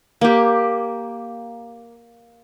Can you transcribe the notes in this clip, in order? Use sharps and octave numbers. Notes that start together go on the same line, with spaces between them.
A#3 G4